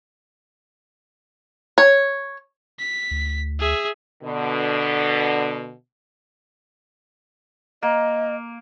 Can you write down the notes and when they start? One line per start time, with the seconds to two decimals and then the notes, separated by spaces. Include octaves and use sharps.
1.78 C#5
2.79 B6
3.11 D2
3.59 G#4 E5
4.23 B2 D3
7.83 A#3 D#5